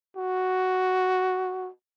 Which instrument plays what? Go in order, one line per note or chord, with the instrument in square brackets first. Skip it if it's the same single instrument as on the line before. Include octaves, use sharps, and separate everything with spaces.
[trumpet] F#4